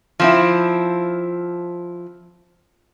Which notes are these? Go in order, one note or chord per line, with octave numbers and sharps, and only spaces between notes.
F3 C4 E4